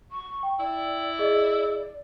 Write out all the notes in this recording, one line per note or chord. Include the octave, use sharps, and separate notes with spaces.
C#6
G5
E4 D5
G#4 D#5